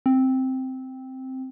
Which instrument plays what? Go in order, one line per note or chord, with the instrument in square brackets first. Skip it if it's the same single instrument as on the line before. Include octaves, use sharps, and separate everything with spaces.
[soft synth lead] C4